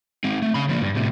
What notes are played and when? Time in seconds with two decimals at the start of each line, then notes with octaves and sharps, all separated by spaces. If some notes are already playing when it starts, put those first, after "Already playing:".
0.24 G#3 C4
0.42 A3
0.54 C#3 B5
0.69 F3 A#3
0.81 G2
0.95 A2 C3